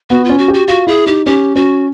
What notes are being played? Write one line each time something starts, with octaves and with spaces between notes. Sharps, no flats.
B3 F#4
F4
C#4
F#4
G4
F#4
F4 F#4
E4 G#4
D#4 G4
C#4 G4
C#4 F#4